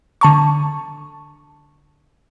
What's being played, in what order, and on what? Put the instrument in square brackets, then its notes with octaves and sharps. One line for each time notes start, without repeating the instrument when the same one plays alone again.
[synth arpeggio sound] D3 A5 C#6